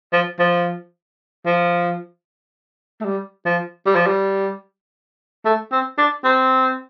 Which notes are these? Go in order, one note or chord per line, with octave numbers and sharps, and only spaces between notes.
F3
F3
F3
A3
G3
F3
G3
F3
G3
A3
C4
D4
C4